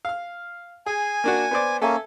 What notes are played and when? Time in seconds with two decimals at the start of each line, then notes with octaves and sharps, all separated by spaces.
0.05 F5 F6
0.86 G#4 G#5
1.24 A#3 D4 F#4
1.51 B3 C5 D5
1.82 A#3 C#4 A4 E5 G#5